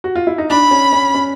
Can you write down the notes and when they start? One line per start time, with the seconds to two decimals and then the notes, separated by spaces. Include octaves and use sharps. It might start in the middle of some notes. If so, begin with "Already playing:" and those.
0.04 F#4
0.16 F4
0.27 E4
0.38 D#4
0.50 D4 B5
0.71 C#4
0.93 C#4
1.14 C#4